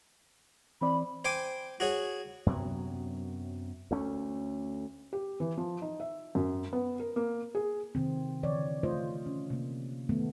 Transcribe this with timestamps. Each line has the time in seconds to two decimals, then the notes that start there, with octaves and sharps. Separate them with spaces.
0.81 E3 C4 D5 B5
1.25 C5 G5 G#5 D6
1.80 F#4 G#4 C#5
2.46 F#2 C3 F#3 B3
3.91 D2 A3 C#4
5.13 G4
5.40 E3
5.57 F3
5.82 D#4
6.00 E5
6.35 F#2
6.73 B3
7.00 A#4
7.16 A#3
7.55 G#4
7.95 C3 D#3 C4
8.43 D3 E3 C#5 D5
8.83 A3 F4 C5 D#5
9.26 C#4
9.50 C3 A#3
10.09 D#3 A3 B3